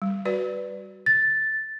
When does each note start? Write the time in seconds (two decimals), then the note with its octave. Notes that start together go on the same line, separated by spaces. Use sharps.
0.02 G3
0.25 F#4 B4 D5
1.06 A6